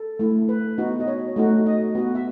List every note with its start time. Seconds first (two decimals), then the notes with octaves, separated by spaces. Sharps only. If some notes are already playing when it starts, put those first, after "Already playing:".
Already playing: A4
0.19 A3 E4
0.49 B4
0.78 B3 D#4 F#4
1.00 D#5
1.07 C#5
1.36 A3 D#4 F#4
1.66 D#5
1.95 B3 F#4
2.15 E5